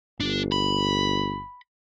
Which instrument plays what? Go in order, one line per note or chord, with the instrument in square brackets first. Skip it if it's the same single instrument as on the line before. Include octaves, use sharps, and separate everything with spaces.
[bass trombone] G1 [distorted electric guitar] D4
[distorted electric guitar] B5